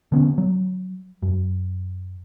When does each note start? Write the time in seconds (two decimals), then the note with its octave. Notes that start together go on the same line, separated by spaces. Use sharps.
0.12 D3 B3 C#4
0.38 F#3
1.23 F#2